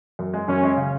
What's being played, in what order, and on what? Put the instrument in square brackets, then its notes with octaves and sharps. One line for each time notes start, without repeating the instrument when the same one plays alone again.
[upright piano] F#2
G#3
[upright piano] F#2 [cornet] C#4
[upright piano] G#3
C#3